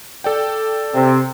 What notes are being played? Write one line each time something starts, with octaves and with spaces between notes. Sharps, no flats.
A4 D5 G5
C3 C4